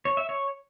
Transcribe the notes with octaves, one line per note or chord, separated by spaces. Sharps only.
C#5
E5
C#5